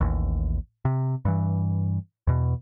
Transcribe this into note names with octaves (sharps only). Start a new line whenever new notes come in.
A1 D#2
C3
G2 E3
E2 B2